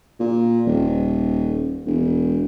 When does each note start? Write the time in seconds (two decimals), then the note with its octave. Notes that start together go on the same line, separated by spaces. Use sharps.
0.20 A#2
0.67 D#1
1.86 E1